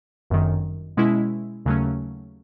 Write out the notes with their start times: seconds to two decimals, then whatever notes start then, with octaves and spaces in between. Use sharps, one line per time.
0.30 G1 F#2 D#3
0.97 B2 G#3 C#4 E4
1.66 D#2 C#3 F#3 A3 C#4